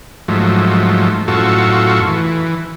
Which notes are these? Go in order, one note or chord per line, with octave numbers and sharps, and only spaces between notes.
G#2 F3 F#3 A3
F#2 A2 F4 F#4 A4 C#6
E3